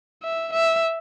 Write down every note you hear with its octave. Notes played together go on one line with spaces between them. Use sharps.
E5
E5